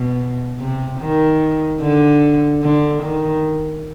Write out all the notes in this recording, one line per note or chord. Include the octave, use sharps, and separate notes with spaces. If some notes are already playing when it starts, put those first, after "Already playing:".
Already playing: B2
C3
D#3
D3
D3
D#3